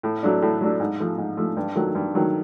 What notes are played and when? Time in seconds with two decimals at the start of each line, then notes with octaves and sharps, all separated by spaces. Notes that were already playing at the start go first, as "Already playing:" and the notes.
0.03 A2
0.23 F#3 A3 D4
0.42 A2
0.61 F#3 A3 D4
0.80 G#2
1.00 F3 A3
1.18 G#2
1.37 F3 A3
1.57 G2
1.76 D#3 F#3 A3
1.95 G2
2.14 D#3 F#3 A3